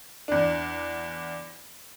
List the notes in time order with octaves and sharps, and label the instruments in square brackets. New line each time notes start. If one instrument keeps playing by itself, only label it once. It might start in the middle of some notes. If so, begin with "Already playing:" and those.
[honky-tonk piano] E2 D4